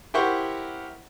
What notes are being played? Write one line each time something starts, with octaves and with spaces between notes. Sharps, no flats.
E4 G4 A#4 C5 F#5 C#6